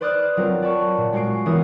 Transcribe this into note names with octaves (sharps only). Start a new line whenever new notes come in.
B4 C5 D5 D#6 F6 F#6
F#3 C4 F4 A#4
D5 A5 B5 C#6
A#2
G#3 F#4 C#6 C7 D7
E3 B3 E4 A#4 C#5 D#6